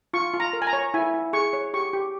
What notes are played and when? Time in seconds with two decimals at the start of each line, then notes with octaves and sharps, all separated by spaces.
0.14 F4 C#6
0.34 F4
0.40 A#5
0.53 A#4
0.62 G#5
0.67 A#5
0.73 C#5
0.94 E4 G#5
1.14 E4
1.33 G#4 C#6
1.53 C#5
1.74 G4 C#6
1.93 G4